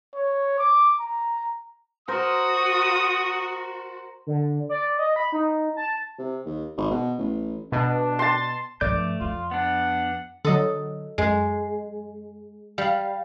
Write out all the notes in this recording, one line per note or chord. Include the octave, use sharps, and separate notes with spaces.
C#5
D6
A#5
F#4 A#4 C5 D#6
D3
D5
D#5
B5
D#4
A5
C3
D#2
G#1
B2
A1
B2 D4
A5 C6
G2 F3 A3 D5 D6 G6
F2 F4
B3 D4 F#5
D3 F#3 A4 D#5
F#2 G#3
G3 F5